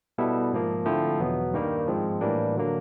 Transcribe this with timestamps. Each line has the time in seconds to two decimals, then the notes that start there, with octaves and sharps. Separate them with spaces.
0.18 B2 G3 B3 E4 A4
0.52 G#2 F3 A#3
0.86 D3 F3 A3 C4 E4
1.20 E2 B2 F#3 B3
1.53 G2 D#3 G3 A#3
1.87 G#2 F3 G#3 C4
2.21 A2 E3 G3 A#3 D4
2.55 D3 F#3 A#3